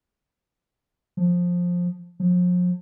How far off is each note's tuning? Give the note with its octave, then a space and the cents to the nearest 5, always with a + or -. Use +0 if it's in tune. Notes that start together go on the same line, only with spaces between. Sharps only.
F3 +15
F3 +40